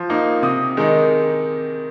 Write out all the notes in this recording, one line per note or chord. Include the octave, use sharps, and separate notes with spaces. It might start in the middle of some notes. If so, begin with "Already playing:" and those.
Already playing: F3
A#3 D#4
C3 D#6
D#3 G#3 D#4